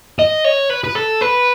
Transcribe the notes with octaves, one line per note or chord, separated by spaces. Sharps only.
D#5
C#5
B4
B4
A4
B4